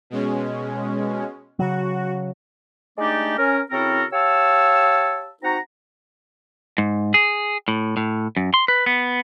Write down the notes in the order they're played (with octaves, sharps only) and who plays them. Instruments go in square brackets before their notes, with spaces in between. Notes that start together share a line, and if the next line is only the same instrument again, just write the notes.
[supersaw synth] B2 G#3 C#4
[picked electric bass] C#3 F#3 [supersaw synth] F#4
[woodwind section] G#3 A3 D4 D#4 G4 D5
C#4 A#4
C#3 C4 E4 F#4 A4 A#4
G4 C#5 F5 A5 E6
C4 D#4 F#4 F#5 A#5
[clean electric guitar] G#2
G#4
A2
A2
F#2
C6
B4
B3